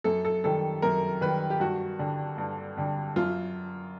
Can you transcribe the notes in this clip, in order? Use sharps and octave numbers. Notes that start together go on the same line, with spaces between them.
F#2 A4
A4
D#3 G3 A4
F#2 A#4
D#3 G3 B4
G4
G2 F#4
D3 G3
G2
D3 G3
F#2 F4